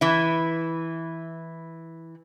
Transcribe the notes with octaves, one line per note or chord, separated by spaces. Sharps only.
E3 E4